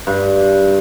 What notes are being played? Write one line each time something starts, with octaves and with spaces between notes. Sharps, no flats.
G2